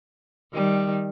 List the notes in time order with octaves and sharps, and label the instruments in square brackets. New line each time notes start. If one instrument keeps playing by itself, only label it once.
[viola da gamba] D#3 G3